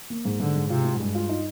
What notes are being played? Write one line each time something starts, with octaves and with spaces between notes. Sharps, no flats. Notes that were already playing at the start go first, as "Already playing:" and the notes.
A#3
G#2
G#2 D3
G#2
C3 F4
G#3
G2 G#3
F4
D#4